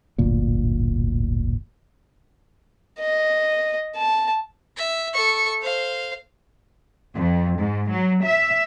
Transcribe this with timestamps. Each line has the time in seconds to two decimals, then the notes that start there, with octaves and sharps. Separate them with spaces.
0.18 D1 G1 D2 A#2
3.00 D#5
3.96 A5
4.77 E5
5.13 A4 C#6
5.62 C5 F5
7.14 F2
7.56 G#2
7.90 F#3
8.22 E5